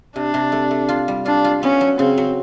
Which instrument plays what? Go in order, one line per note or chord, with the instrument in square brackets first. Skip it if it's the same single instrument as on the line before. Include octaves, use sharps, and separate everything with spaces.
[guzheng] C3 [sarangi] D4
[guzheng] C3
A3
A3
F4
G3
[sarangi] D4 [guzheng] F4
[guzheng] F4
[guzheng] B3 [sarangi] C#4
[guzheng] F#3
[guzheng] C#3 [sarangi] C4
[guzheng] F#3